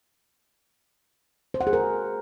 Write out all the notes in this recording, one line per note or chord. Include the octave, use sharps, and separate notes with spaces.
C5
F#5
G#4
A#4